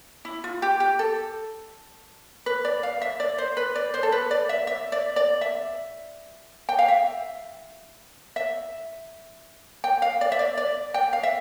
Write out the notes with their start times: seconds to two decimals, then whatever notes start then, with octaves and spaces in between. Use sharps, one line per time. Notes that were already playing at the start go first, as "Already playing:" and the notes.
0.25 E4
0.44 F4
0.62 G4
0.80 G4
0.99 A4
2.46 B4
2.65 D5
2.83 F5
3.02 E5
3.20 D5
3.38 C5
3.57 B4
3.76 D5
3.94 C5
4.03 A4
4.12 B4
4.31 D5
4.49 E5
4.67 E5
4.92 D5
5.16 D5
5.41 E5
6.69 G5
6.79 F5
6.88 E5
8.36 E5
9.84 G5
10.02 F5
10.21 D5
10.32 E5
10.39 D5
10.57 D5
10.94 G5
11.13 F5
11.23 E5